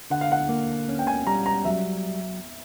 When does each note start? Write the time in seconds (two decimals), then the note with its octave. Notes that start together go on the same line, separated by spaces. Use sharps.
0.10 D3 F#5
0.21 F5
0.32 F#5
0.49 A#3
0.89 C#4
0.99 G5
1.07 G#5
1.27 G3 A#5
1.46 A#5
1.65 F#3 E5